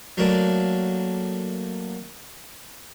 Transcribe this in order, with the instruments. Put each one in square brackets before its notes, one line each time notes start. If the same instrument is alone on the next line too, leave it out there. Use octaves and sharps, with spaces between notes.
[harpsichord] F#3 A3 A#3 D4